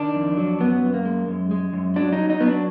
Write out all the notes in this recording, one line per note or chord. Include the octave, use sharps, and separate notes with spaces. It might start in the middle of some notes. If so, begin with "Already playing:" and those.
Already playing: D#3 D4
F2
F#3
F#2 B3
F#2
A#3
G#3
F#2
G#3
F#2
F#3 D4
D#4
F#3
D#4
F#3 B3
D4